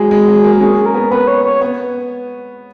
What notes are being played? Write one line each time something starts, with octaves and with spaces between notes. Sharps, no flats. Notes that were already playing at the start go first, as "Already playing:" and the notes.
Already playing: F#3 G#3 G#4
G#3
F#3
A#3
C#4 G#4
A#4
B3
B3 B4
C#5
C#5
B3